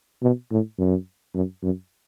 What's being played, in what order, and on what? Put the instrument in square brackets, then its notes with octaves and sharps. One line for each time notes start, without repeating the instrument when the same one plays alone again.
[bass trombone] B2
A2
F#2
F#2
F#2